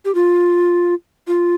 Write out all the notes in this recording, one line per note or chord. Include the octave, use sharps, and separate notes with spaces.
G4
F4
F4